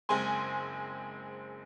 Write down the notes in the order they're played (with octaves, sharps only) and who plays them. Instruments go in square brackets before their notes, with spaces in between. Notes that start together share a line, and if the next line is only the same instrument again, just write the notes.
[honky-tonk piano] F#1 G#3 C4 G#5 C6